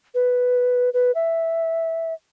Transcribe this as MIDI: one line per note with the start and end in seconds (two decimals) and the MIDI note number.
0.15 0.89 71
0.94 1.11 71
1.15 2.14 76